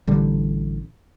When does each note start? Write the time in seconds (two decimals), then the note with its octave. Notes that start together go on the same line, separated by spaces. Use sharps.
0.07 A1 D3 G3